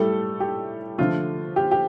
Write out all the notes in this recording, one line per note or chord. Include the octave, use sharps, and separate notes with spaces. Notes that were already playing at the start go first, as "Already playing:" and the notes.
Already playing: A2 G3 A3 A4
G4
D3 F3 A3 F4
G4
G4